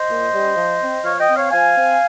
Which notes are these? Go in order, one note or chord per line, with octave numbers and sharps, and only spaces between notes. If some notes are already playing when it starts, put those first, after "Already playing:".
Already playing: C5 D#5
A#2
G3 C#4
F3
C4
F3 C#5 F5
D#5 G5
C4
C#5 F5
F3 F5 G#5
C4